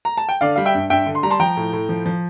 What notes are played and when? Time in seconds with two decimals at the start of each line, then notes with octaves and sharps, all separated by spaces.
0.05 A#5
0.17 A5
0.29 G5
0.41 D3 D5 F5
0.56 G3 F5
0.65 E5 G5
0.75 G2
0.90 G2 E5 G5
1.06 D3
1.15 C6
1.23 G3 A#5
1.30 A5 C6
1.40 F3 G5 A#5
1.57 A2
1.73 A2
1.89 F3
2.06 F3